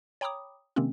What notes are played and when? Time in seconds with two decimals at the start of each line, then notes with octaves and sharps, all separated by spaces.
0.21 C#5 G5 A#5 B5 D6 D#6
0.76 C3 D#3 G#3 A#3 C4 C#4